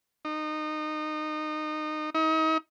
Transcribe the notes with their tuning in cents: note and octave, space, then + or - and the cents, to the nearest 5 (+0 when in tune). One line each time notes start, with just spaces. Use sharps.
D#4 -25
D#4 +35